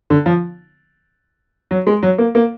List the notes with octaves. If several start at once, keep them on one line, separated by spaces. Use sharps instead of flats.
D3
F3
F#3
G#3
F#3
A#3
A#3